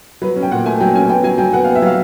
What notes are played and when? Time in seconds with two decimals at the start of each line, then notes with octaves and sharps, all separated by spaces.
0.22 F#3 B4
0.36 C#4
0.43 G5
0.51 A#2 F#5
0.66 A3 G#5
0.80 F#3 G5
0.94 C#4 G#5
1.09 B3 G5
1.24 F#3 G#5
1.38 F#3 G5
1.53 B3 F#5
1.65 F5
1.68 B3
1.75 E5
1.82 F#3 F5